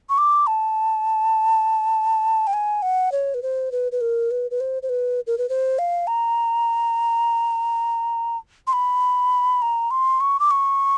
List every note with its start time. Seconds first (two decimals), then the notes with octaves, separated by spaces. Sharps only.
0.09 C#6
0.18 D6
0.47 A5
2.47 G5
2.53 G#5
2.82 F#5
3.12 C#5
3.34 B4
3.42 C5
3.72 B4
3.92 B4
4.01 A#4
4.31 B4
4.51 B4
4.60 C5
4.82 C5
4.89 B4
5.27 A#4
5.38 B4
5.49 C5
5.79 F5
6.07 A#5
8.67 C6
8.73 B5
9.62 A#5
9.91 C6
10.20 C#6
10.40 D6
10.51 C#6